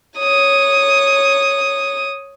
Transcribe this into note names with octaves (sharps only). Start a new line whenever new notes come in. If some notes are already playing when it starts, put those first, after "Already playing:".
C#5 D#6